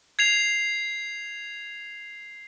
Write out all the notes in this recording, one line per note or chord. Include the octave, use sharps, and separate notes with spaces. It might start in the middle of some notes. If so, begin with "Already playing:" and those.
G#6 C7 F7